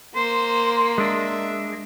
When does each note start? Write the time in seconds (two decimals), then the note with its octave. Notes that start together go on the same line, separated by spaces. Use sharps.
0.16 A#3 C5 C6
0.98 G#3 D4 E5